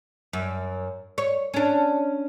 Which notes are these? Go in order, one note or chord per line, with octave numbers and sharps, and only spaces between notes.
F#2
C#5
C#4 D4